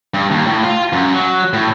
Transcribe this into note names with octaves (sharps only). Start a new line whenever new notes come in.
G2
D#2
A2
F4
F#2
F#3
A2